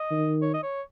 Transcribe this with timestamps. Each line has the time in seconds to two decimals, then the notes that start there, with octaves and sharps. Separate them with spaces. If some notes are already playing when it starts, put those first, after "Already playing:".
Already playing: D#5
0.11 D#3
0.42 C#5
0.54 D#5
0.63 C#5